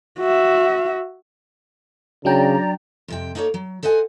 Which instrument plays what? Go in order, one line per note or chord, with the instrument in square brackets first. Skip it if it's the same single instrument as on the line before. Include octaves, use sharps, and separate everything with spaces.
[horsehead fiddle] F#4 E5
[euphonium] C#3 [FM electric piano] F#3 D4 G5 [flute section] D5 A#5
[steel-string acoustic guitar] F2 C3 G5
A#3 D#4 A4 B4 C#5
F#3
A4 C5 D#5 F#5 G#5